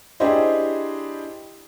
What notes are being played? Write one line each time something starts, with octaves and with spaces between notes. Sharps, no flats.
D4 E4 G4 G#4 C5 D#5